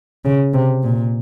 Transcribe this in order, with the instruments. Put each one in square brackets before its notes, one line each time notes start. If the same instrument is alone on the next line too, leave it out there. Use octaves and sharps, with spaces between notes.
[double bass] C#3
C3
A#2